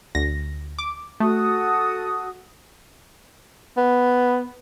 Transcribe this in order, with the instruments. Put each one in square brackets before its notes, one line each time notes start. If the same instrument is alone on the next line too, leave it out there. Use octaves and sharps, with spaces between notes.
[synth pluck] D2 A#6
D6
[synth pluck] A3 [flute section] F#4 A4 D#6
[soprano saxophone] B3